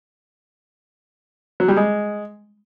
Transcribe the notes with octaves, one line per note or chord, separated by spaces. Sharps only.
F#3
G3
G#3